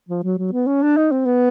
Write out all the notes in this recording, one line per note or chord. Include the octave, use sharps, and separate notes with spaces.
F3
F#3
F#3
B3
C#4
D4
D#4
C4
B3